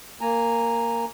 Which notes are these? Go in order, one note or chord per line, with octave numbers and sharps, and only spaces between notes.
A#3 G#5 A#5